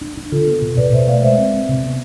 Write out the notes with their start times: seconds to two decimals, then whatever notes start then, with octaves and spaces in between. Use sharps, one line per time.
0.01 D4
0.17 D4
0.32 D3 F4 A4
0.47 B3
0.62 B2
0.77 B2 B4 D5
0.93 B2 C5 E5
1.07 A3 D5 F5
1.22 G#3 C5 E5
1.38 C4
1.54 C4
1.69 C3
1.84 B3